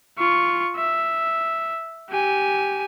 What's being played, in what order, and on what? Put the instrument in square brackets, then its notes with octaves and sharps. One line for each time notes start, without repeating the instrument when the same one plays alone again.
[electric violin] F4 C#6
E5
G4 G#5